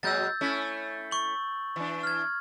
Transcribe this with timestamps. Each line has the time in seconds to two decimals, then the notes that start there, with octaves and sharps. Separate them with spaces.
0.03 A#2 F#3 G#3 E6 G6 A6
0.41 A3 C#4 E4
1.11 C#6 F#7
1.76 E3 D4
2.03 F6 G#6